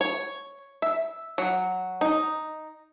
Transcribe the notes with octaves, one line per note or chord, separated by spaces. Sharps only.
C#5
E5
F#3
D#4